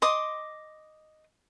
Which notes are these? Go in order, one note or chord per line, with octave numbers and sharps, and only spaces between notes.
D#5 C6 D6 D#6